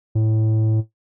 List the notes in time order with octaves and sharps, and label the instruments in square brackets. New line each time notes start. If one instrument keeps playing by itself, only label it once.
[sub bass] A2